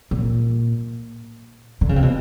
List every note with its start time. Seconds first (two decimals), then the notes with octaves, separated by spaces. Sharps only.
0.11 A#2
1.81 D3
1.89 C#3
1.96 C3
2.02 B2